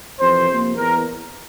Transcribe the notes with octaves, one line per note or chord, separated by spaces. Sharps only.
F2 C3 E3 C5
C3 F3 A#3
E2 E3 A#4